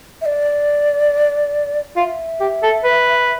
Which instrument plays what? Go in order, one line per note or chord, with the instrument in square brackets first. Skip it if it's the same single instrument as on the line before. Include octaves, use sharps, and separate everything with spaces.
[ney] E5
D5
[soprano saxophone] F4 [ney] E5
[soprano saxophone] G4
A4
B4